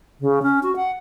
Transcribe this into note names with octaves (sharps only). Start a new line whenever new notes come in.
C#3
C#4
F#4
F#5